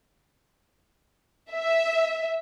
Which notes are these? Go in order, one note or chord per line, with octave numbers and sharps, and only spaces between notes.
E5